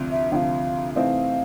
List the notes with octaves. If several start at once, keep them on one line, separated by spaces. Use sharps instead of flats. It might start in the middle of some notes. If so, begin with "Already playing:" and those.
Already playing: D2 C3 F3
E5
D2 C3 F3 F5 G5
C3 E3 A3 C4 D#4 F5